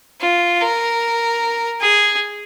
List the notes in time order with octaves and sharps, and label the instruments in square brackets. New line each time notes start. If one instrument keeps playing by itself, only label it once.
[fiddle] F4
A#4
G#4